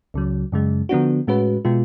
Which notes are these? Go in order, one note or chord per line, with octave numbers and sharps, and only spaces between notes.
C#2 C#3 F#3
F#2 C#3 G#3
D3 F3 B3 D4 F#4
A2 G#3 C#4 F#4 B4
B2 G#3 B3 F4